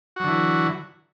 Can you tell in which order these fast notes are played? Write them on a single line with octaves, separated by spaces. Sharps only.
F#4 F#3 D3 E3